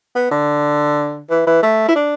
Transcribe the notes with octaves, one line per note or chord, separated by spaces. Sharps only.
B3
D3
E3
E3
A3
E4
D4